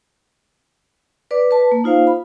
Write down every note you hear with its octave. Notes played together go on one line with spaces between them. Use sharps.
B4 D5 D6
B4 A5
A#3
D#4 F4 C5 F5
B5